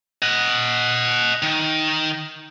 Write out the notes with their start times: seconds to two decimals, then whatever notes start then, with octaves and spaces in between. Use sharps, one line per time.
0.22 D#5 F#5
1.42 D#3